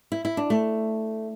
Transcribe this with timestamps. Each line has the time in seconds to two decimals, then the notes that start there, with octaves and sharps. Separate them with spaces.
0.12 E4
0.25 E4
0.37 D4
0.50 A3